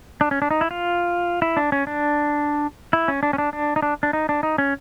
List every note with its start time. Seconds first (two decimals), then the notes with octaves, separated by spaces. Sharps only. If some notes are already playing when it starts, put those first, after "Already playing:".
0.21 D4
0.31 C#4
0.42 D4
0.51 D#4
0.61 E4
0.71 F4
1.42 E4
1.57 D4
1.72 C#4
1.87 D4
2.93 E4
3.08 C#4
3.23 D4
3.33 C#4
3.38 D4
3.53 D4
3.76 D#4
3.82 D4
4.03 D4
4.13 D#4
4.29 D4
4.43 D#4
4.58 C#4